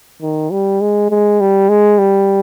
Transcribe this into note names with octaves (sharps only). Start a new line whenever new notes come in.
D#3
G3
G#3
G#3
G3
G#3
G3